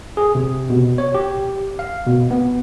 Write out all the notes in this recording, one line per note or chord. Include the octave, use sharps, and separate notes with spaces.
G#4
C3
B2
C#5
G4
F5
B2
B3